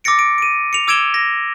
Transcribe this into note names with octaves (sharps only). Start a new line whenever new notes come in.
D6 E6 A6 A#6 C#7 D7
D7
D7 D#7
C#7 F7
D6 E6 G#6 D7 E7 G7
A#6